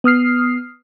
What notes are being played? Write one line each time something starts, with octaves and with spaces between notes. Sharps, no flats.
B3 D#6 F6 C7